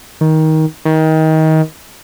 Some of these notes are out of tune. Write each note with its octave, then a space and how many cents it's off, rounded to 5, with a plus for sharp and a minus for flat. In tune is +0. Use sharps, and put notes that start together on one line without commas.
D#3 +20
D#3 +25